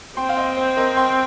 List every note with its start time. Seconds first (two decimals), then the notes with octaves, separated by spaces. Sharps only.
0.17 C4 G5 C6
0.29 F5
0.37 D#5 G5
0.57 C5
0.77 A#4 D#5
0.97 G5 C6